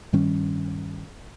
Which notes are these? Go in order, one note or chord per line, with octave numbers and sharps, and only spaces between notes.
G2 D#3 G3 C#4